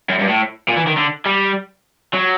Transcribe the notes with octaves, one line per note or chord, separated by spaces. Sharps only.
F#2
G2
A2
A#2
E3
D#3
D3
G3
F#3